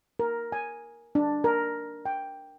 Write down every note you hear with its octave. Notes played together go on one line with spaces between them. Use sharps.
A#4
G#5
D4
A#4
G5